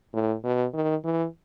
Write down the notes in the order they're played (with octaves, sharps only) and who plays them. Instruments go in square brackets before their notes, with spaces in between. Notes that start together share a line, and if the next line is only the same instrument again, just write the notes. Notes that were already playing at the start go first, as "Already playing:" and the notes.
[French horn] A2
B2
D#3
E3